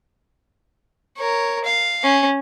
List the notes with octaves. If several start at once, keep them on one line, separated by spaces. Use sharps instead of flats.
A#4 C#5
F5
C#4